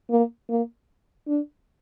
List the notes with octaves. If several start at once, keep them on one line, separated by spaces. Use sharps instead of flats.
A#3
A#3
D4